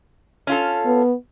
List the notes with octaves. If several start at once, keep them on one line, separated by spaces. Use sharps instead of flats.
C#4 F4 A4
B3